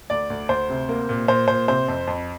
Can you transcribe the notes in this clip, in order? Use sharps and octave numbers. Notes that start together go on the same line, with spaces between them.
D2 D5
D2
D2 C5
C3
A#3
A#2
A#2 C5
A#2 C5
C3 C5
F2
F2